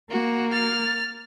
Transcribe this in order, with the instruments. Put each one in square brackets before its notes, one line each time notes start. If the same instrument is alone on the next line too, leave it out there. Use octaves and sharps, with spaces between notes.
[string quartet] A#3 [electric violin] F#4
[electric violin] F6 A6